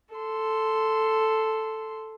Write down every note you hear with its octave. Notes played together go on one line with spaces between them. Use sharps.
A4 C6